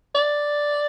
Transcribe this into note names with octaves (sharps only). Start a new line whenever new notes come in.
D5